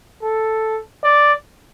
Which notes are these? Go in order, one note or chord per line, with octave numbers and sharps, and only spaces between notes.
A4
D5